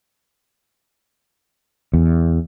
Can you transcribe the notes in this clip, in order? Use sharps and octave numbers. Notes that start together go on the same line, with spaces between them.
E2